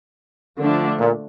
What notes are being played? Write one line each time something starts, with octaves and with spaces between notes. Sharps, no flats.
D3 F3 A3 D4
A#2